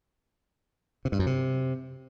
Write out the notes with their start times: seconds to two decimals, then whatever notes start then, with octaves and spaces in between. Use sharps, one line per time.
1.05 C3
1.12 G2
1.19 F#2
1.26 C3